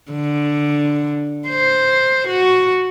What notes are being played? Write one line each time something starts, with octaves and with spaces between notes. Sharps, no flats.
D3
C5
F#4